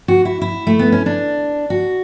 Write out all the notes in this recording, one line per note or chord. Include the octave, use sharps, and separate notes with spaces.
F#4
E4
E4
A3
B3
C#4
D4
F#4